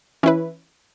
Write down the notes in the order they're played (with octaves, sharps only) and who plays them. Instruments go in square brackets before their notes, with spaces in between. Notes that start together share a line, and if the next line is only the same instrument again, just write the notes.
[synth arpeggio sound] E3 C#4 E4 B4